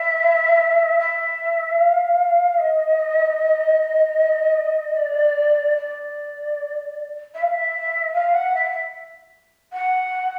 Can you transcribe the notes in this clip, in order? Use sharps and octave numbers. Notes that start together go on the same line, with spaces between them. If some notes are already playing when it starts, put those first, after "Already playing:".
Already playing: E5
E5
F5
D#5
D5
D5
E5
F5
E5
F5
F#5
E5
F#5